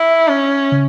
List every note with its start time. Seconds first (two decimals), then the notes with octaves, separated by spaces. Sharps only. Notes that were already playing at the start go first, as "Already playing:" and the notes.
Already playing: E4
0.28 C#4
0.72 C#3